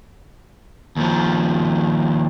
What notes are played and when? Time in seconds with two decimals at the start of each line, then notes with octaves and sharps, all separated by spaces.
0.96 D#2 F3